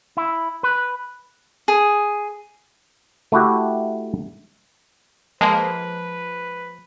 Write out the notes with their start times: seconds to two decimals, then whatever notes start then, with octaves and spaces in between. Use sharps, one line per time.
0.17 E4
0.63 B4
1.68 G#4
3.32 A3 E4 F#4 G4
5.41 F3 G#3 A#3 B4 A5